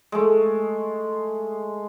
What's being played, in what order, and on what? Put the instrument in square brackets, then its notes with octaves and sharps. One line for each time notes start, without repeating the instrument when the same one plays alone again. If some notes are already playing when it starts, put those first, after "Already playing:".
[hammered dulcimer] G#3 A3